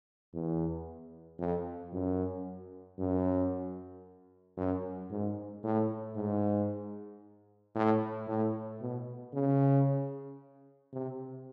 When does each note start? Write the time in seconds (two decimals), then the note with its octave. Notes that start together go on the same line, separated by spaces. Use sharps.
0.34 E2
1.39 F2
1.93 F#2
2.99 F#2
4.57 F#2
5.11 G#2
5.64 A2
6.16 G#2
7.75 A2
8.28 A2
8.81 B2
9.33 C#3
10.93 C3